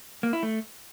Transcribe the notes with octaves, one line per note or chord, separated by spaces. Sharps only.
A#3
E4
A3